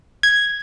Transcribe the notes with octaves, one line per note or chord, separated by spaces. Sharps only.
G#6